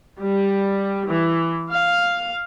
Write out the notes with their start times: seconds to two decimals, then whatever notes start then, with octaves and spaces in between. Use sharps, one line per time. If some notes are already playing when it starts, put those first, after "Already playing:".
0.20 G3
1.07 E3
1.70 F5